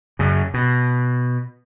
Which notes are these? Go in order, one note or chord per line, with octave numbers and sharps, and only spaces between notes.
F#2 C#3
B2